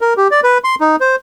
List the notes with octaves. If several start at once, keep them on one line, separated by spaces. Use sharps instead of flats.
A#4
G4
D5
B4
C6
D#4
C5